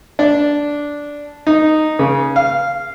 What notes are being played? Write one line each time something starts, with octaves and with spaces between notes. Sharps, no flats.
D4
D#4
C#3
F5